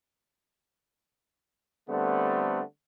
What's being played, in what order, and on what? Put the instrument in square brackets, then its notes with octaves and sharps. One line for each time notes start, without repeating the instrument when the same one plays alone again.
[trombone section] D3 G3 A3 B3 C4